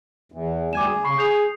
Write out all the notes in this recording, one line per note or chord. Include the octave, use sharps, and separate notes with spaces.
E2
D2 G3 G#5 D6 G#6 E7
G#4
C#3 B5 C#6 C7
G#4 G6 C7 F7